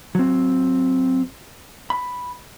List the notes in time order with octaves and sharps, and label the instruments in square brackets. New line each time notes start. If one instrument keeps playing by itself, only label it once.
[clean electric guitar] F#3 C4
B5